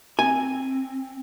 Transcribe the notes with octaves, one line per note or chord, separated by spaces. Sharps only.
C4 G#5